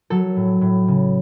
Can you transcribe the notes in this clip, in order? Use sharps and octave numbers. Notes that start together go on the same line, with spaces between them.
F#3 A4
A2
A2
C#3